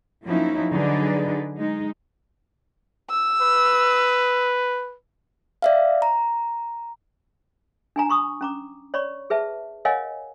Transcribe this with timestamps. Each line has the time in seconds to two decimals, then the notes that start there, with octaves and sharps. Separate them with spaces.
0.24 F3 F#3 A#3 C#4 D#4 E4
0.72 D3 F#3 D#4 G#4 B4 D5
1.60 G#3 D#4
3.10 E6
3.41 B4
5.62 D5 E5 F5
6.02 A#5
7.96 D4 G#5 A#5
8.09 B5 C#6 D#6
8.41 C#4 A#5 D6
8.94 C#5 D5 B5 C#6
9.30 G#4 B4 E5 A5
9.85 A#4 C#5 D#5 F5 F#5 G#5